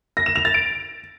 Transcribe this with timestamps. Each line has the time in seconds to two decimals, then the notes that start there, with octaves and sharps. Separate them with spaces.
0.17 A#6
0.26 E7
0.36 F7
0.45 A6
0.54 D7